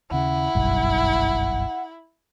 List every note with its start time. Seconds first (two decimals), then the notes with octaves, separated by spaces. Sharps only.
0.11 D#2 C#3 E4 F#5
0.55 F#1 B1 G2